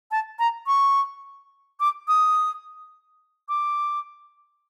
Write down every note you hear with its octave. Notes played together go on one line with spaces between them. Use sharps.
A5
A#5
C#6
D6
D#6
D6